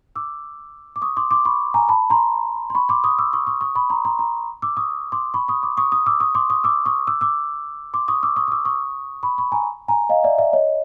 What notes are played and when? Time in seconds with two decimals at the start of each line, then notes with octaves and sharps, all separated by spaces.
0.16 D6 E6
0.96 D6
1.02 C#6 D#6
1.17 C6 D6
1.31 C6 D6
1.45 B5 C#6
1.74 G#5 A#5
1.89 A5 B5
2.10 A#5 C6
2.70 C6
2.75 B5 C#6
2.89 C6 D6
3.04 C#6 D#6
3.19 D6 E6
3.33 C#6 D#6
3.47 C#6 D#6
3.61 C#6 D#6
3.75 B5 C#6
3.90 A#5 C6
4.05 A#5 C6
4.19 A#5 C6
4.62 D6 E6
4.77 C#6 D#6
5.12 C6 D6
5.34 B5 C#6
5.48 C#6 D#6
5.63 C6 D6
5.77 C#6 D#6
5.92 C#6 D#6
6.06 D6 E6
6.20 C#6 D#6
6.35 C6 D6
6.50 C#6 D#6
6.64 D6 E6
6.86 C#6 D#6
7.07 D6 E6
7.21 D6 E6
7.94 C6 D6
8.08 C#6 D#6
8.23 D6 E6
8.36 C#6 D#6
8.48 D#6
8.52 D6 E6
8.65 C#6 D#6
9.23 B5 C#6
9.38 B5 C#6
9.52 G#5 A#5
9.88 G#5 A#5
10.09 D#5 F5
10.24 D5 E5
10.38 D5 E5
10.53 C#5 D#5